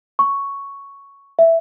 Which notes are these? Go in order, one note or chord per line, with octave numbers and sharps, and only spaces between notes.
C#6
E5